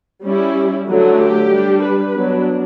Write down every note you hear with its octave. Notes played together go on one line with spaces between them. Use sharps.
G3 C#4 E4
D3 F#3 A3
G4
G3 D4
B4
F#3 B3 D4